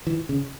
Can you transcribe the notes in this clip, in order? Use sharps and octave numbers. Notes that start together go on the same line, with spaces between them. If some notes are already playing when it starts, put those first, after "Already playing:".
E3
C#3